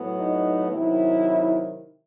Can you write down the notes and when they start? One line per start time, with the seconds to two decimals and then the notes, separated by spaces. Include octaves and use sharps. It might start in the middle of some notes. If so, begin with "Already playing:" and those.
Already playing: A2 F#3 B3
0.18 D#4
0.71 C3 D#3 F#3 E4